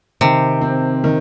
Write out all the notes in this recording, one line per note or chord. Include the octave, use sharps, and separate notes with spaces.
C3 D#3
C4
D#3